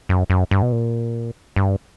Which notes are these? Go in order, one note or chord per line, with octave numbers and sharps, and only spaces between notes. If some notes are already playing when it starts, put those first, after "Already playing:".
F#2
F#2
G2
B2
A#2
G2